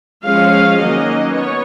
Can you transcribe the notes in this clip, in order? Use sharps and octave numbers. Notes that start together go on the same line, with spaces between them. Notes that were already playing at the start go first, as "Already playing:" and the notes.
F3 G#3 C#4 F5
D#3 F#3 A#3 C#4 D#5
B3 C#5